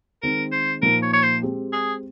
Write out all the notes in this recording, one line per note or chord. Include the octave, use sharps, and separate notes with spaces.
D#3 G#3 C4 A#4
C5
A#2 F3 A#3 D#4 A#4
C#5
C#5
C5
G#3 C4 G4
G#4